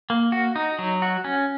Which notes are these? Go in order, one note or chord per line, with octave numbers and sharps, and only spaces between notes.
A#3
F#4
D#4
F#3
F#4
C#4